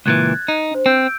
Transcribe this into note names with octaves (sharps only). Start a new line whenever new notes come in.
C#2 A#2 E3 F#6 G#6 A6
D#4
D4 C5
C4 E6 G6 D7